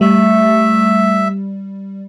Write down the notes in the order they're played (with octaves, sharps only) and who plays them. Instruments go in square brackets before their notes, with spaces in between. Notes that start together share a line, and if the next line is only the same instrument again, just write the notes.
[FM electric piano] G3 [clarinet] A3 [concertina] E5